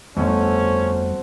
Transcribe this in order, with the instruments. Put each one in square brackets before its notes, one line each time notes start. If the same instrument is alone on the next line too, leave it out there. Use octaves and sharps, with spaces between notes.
[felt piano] G1 A3 [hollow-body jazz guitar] F2 [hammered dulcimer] C4 F#4 A4 [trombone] C#4